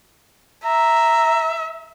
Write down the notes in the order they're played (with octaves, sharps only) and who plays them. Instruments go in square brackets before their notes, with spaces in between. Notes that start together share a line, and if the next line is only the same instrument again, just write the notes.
[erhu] E5 [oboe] A#5